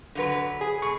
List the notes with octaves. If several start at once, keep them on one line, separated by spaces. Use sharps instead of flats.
D3 F#3 B4
G#4
B2 C#6